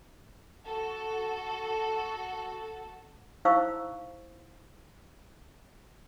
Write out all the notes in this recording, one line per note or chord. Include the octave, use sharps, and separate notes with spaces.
F#4 A4
D#4 E4 C5 F5 C#6 E6